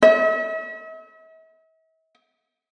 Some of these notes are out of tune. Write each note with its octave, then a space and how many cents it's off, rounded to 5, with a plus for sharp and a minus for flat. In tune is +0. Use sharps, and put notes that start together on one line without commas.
E5 -45